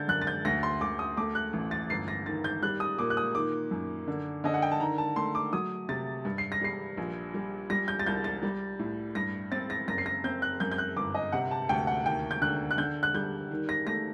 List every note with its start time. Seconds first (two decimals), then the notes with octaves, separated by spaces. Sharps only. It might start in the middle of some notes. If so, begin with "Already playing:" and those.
Already playing: D3 G6 A6
0.08 F#2 F#6
0.22 A6
0.27 G6
0.45 D2 A#6
0.63 C6
0.81 D2 D6
0.99 D#6
1.17 A3 D6
1.35 F#6
1.53 A1
1.71 A6
1.90 G1 C7
2.08 A#6
2.26 D#3 A6
2.44 G6
2.62 G3 F#6
2.80 D#6
2.98 A#2 D6
3.10 F#6
3.17 D#6
3.35 D#3 D6
3.71 F#2
4.08 D3
4.44 D3 D#5
4.54 F#5
4.62 G5
4.72 A5
4.80 D#3 A#5
4.98 A5
5.16 A3 C6
5.35 D6
5.53 F#3 D#6
5.89 C3 A6
6.25 G2
6.38 C7
6.52 A#6
6.61 G3 C7
6.97 A#1
7.34 G3
7.70 G3 A#6
7.88 G6
7.99 A6
8.06 C2 G6
8.24 A6
8.43 G3
8.79 A2
9.15 G2 A#6
9.52 C4 A6
9.70 A#6
9.88 F#1 A#6
9.98 C7
10.06 A#6
10.24 C4 G6
10.42 F#6
10.60 F#2 G6
10.71 G6
10.78 F#6
10.96 G1 D6
11.15 D#5
11.32 C3 F#5
11.51 A5
11.69 D2 G5
11.87 F#5
12.06 D#2 G5
12.31 G6
12.41 D3 F#6
12.71 F#6
12.78 D3 G6
13.03 F#6
13.14 G3 G6
13.51 D#3
13.69 A#6
13.87 A3 A#6